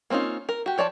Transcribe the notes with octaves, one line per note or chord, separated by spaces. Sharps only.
A#3 C4 C#4 D#4 F4
A#4
F#4 G4
F3 C#5 D5 A5